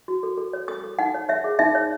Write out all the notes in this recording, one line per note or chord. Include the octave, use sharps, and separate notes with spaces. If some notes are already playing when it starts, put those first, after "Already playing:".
F#4
A4
A4
C#5
A4 D#6
A4
D#4 F#5
C#5
C#5 E5
G#4
D#4 E5
C#5